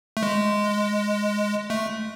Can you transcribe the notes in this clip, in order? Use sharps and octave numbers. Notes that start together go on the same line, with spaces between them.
A3
G#3
A3